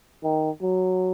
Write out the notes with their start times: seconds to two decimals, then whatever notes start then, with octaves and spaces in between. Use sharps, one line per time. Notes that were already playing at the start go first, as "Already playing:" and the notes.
0.24 D#3
0.62 F#3